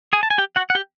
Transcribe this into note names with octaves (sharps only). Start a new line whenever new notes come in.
G#4 G#5
A5
G#5
G4 G5
F#4 F#5
F#5
G4 G5